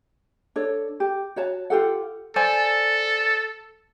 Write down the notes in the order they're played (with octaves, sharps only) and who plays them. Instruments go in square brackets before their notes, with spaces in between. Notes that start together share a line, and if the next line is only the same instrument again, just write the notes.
[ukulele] D4 A4 C#5
G4
F#4 C#5 A5
F4 G4 A4 F#5
[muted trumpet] A4 [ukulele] C5 D5 G#5